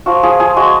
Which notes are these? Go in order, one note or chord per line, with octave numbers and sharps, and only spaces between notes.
F3 F#4
F3 G#4
F3 G#4
G#3 F#4